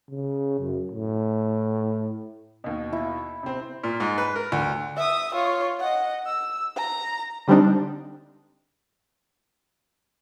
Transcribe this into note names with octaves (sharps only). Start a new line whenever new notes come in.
C#3
F#2
A2
D#2 B2
E4
C3 C4
A#2
G#2
B4
A#4
D2
E5 D#6
F4 C#5
D#5 F#5
E6
A#5
D3 G3 C4 D4 D#4